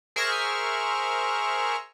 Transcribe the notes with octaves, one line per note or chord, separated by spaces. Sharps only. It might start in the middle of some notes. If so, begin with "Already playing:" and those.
G#4 A#4 C5 E5 C#6 F6